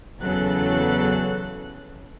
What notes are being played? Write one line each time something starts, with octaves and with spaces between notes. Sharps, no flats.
E2 C#3 F#3 A4 F#6